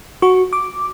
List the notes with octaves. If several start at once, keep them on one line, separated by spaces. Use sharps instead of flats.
F#4 C#6
D6